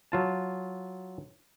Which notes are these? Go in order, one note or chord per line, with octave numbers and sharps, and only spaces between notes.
F#3 F4 A5